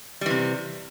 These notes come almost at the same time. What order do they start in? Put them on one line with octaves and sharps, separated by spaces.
G3 E3 C3